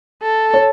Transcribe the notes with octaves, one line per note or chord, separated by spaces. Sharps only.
A4
C#5